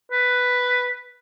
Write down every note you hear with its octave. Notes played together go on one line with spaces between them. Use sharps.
B4